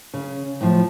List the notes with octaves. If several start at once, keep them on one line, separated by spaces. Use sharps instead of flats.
C#3
A2 F3